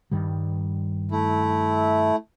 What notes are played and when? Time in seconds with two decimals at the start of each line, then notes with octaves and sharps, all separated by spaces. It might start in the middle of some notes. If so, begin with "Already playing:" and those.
0.12 G2 D#3 G3
1.11 A3 E4